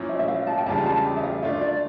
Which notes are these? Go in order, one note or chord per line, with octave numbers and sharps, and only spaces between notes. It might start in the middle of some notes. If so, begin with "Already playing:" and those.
Already playing: A#2 F3 C#4 E4
E5
E5
F5
A5
G5
E2 C#3 G3 D4 F4 A5
A5
G5
E5
F5
D3 A3 D4 F4 E5
D5